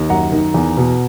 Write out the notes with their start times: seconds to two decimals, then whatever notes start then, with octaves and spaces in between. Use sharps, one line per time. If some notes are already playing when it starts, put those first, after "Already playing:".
Already playing: D#2
0.10 F#2 F#5 A#5
0.32 D#3
0.54 E2
0.77 B2